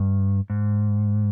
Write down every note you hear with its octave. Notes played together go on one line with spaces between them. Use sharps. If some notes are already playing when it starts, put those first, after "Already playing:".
Already playing: G2
G#2